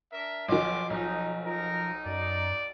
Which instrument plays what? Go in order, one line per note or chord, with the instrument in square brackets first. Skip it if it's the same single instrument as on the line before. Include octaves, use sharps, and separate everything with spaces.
[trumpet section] D4 A#4 E5
[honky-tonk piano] B1 D#3 [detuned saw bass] F3 [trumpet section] B3 C6 D6
[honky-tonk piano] B1 [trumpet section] D#4
[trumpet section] D#4 [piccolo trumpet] A#4
[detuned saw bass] F#2 [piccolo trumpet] D5